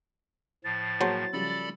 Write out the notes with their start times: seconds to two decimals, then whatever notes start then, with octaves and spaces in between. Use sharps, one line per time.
0.64 A2 F3 A6
1.01 F#3 A#3 G#4 C5 A5
1.33 C#3 F3 G3 A4 D5 B5